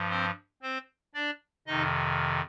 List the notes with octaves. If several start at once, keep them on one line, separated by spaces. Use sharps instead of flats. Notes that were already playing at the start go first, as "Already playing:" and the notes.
Already playing: G2 F3
C4 C5
C4 C5
D4 D5
F2 C3 D#3 D#4 D#5